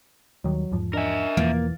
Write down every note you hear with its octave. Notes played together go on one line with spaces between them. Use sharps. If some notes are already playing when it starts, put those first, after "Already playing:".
D#2 D#3 F#3 G3
E2 G#2 F3
D4 A#4 D#5 E5 G#5
E1 E2 E3 F3 A#3 A6